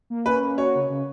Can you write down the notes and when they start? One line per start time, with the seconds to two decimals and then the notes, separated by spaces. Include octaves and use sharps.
0.10 A#3
0.26 C#4 B4
0.41 A#3
0.58 F#4 C#5
0.75 C#3
0.89 C#3